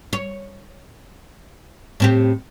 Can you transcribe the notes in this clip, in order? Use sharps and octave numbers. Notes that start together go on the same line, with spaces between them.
C#5
A2 C4 G4